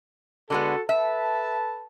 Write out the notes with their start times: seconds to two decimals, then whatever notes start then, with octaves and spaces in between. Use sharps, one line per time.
0.50 D3 G#3 B3 F#4 A4
0.89 A4 B4 E5 A5